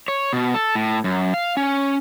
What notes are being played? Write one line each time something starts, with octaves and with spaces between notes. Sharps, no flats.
C#5
B2
A4
A2
F#2
F5
C#4